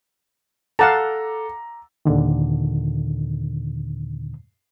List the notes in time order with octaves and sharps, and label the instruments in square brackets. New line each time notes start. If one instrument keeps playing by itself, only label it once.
[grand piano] A4 [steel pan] F5 F#5 A5 [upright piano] A#5 D6
[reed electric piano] D#2 A#2 D3 D#3